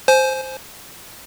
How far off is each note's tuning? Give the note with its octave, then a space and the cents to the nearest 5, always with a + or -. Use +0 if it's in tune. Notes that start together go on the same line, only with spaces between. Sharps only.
C5 +0 G#5 +25